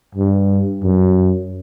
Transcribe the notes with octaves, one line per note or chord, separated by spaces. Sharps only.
G2
F#2